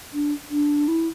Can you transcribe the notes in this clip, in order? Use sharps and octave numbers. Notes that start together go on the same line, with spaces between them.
D4
D4
E4